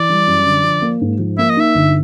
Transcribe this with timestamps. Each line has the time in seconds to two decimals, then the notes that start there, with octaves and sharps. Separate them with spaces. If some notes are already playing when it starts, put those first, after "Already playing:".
Already playing: E3 D5
0.09 G3
0.27 F#2
0.45 D3
0.63 F3
0.82 A#3
1.01 G#2
1.19 F3
1.38 A#3 E5
1.50 D#5
1.57 D#4 E5
1.75 G1